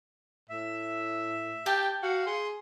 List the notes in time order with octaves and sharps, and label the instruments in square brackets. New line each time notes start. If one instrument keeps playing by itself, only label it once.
[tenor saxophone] A2 [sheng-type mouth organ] E5
[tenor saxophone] G4 [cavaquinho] G5 A5
[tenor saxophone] F#4 [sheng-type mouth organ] F5 F#5
[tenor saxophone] G#4 [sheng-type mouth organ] C6